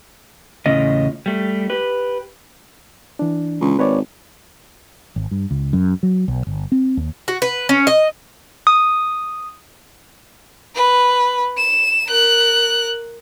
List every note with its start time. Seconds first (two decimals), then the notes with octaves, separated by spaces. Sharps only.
0.66 E2 A2 C#3 C#4 F4 D#5
1.26 G3 A3
1.70 G4 B4
3.19 E3 D4
3.61 C#2
3.79 G#1 B4 C#5 D5
5.16 G#1
5.31 G2
5.51 C#2
5.73 F#2
6.03 F#3
6.28 B1
6.47 G1
6.72 C4
6.97 D#2
7.28 F#4
7.42 B4
7.69 C#4
7.87 D#5
8.67 D#6
10.75 B4
11.58 E7
12.07 A#4 F#6